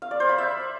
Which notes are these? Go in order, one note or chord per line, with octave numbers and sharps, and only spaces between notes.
F5
D5
C5
B5
E5